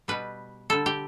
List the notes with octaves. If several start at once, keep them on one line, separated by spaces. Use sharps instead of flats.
B2 G3 B4
D3 G3 A4
G4